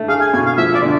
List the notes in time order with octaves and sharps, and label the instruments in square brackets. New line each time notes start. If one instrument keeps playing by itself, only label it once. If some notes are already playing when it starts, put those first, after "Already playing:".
Already playing: [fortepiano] A3
[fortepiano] G#4 [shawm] F5
[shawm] G#5
[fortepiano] B2 [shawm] G#5
[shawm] F5
[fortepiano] F3 [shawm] E5
[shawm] D5
[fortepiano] D3